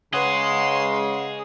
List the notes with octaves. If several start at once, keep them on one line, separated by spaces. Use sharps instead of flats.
C#3 G#4 B4 C#5 D#5 F#5 C6